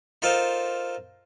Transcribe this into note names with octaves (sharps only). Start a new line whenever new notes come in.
D#4 F4 A4 A#4 C5 F5